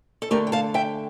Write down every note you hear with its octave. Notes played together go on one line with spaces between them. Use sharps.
A4
D3 A3 G4 A#4
G5
F5 A5
E5 G5